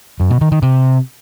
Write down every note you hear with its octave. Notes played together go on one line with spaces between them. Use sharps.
F#2
B2
D#3
D#3
C3